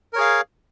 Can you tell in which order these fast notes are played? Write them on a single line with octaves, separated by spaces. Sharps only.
A#4 C#5 G#4 F5